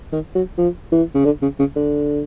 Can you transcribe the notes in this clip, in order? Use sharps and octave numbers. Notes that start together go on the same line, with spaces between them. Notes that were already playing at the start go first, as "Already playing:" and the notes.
D#3
F#3
F3
E3
C#3
D3
C#3
C#3
D3